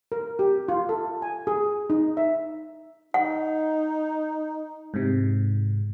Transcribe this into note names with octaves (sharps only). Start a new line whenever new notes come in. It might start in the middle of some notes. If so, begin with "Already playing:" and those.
A#4
G4
F4
A4
G#5
G#4
D#4
E5
D#4 F#5
G#2 C3